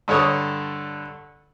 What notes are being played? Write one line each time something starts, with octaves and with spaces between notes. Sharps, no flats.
G2 D3 A4 C#5 D#6